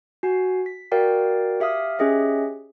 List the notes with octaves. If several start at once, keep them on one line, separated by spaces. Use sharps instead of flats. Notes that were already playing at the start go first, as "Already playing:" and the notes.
F#4 G#5 C7
B6
F#4 A#4 D5 F5 G5
G4 E5 F5 D#6 F6
C#4 G4 G#4 D#5 E5